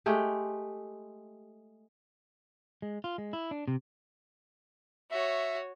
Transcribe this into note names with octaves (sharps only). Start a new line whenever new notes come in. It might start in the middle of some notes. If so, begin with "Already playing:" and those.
G#3 A3 G4
G#3
F4
G#3
E4
D4
C3
F#4 C#5 E5